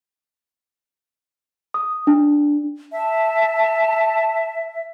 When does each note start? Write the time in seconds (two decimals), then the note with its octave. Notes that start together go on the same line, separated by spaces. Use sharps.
1.74 D#6
2.07 D4
2.92 E5 A5